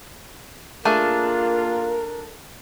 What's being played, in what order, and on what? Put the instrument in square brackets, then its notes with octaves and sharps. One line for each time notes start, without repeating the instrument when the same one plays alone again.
[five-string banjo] A3 G#4 F5 [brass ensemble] A#3 F4 [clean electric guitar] D4 [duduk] A#4